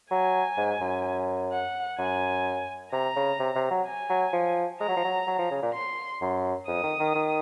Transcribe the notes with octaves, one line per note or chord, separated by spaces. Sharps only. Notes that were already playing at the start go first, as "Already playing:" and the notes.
F#3 G#5
G#2
F#2
F#5
F#2 G#5
C3 A#5
C#3
C3
C3
F#3
G#5
F#3
F3
G#3 A#5
F#3
F3
F#3
F#3
F3
C#3
A#2
C6
F#2
F2 D#6
D#3
D#3
D#3